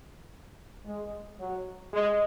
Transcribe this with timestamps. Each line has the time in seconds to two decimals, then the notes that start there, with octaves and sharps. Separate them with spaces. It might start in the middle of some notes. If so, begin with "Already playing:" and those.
0.85 G#3
1.39 F#3
1.93 G#3